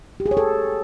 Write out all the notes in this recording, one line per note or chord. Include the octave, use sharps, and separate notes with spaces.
G4
G#4
C#5
A4